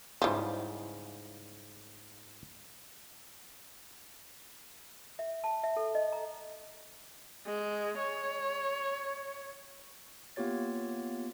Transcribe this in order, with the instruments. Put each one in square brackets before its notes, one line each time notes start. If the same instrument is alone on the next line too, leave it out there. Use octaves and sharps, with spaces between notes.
[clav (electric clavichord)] G#2 C#3 G3 [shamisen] E3 F3
[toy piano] E5
A5
E5
A4
D#5
A#5
[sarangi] G#3
C#5
[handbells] A#3 B3 F4 G4 C#5 A6